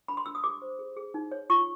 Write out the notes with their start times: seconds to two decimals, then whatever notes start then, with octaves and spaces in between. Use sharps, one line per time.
0.08 D4 B5
0.17 C6
0.26 D4 E6
0.35 D#6
0.44 G4 D6
0.62 C5
0.79 G#4
0.97 G#4
1.14 D#4
1.31 C#5
1.50 F4 C#6